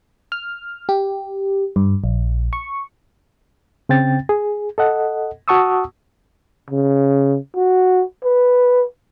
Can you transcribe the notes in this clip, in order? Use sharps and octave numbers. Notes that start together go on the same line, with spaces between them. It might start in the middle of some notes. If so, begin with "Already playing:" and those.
F6
G4
G2
A#1
C#6
C#3 C4 G5 A6
G#4
A4 D#5 F#5
F#4 F#5 A5 C#6 D#6 E6
C#3
F#4
B4